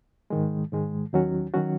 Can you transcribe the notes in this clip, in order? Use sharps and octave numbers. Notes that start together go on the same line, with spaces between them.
G#2 D#3 G#3
G#2 D#3 G#3
D#2 D#3 F#3 C#4 F#4
D#3 F#3 C#4 F#4